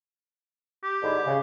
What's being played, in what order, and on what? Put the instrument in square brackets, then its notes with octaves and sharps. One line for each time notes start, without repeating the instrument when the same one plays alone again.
[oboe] G4
[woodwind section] G#2 D3 E4
C#3